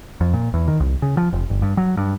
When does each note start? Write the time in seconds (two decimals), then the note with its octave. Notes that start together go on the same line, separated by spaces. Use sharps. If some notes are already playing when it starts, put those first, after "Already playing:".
0.21 F2
0.34 A#2
0.54 E2
0.68 D#3
0.80 C2
1.02 C#3
1.17 F3
1.33 F1
1.50 G1
1.62 G2
1.77 F#3
1.97 G2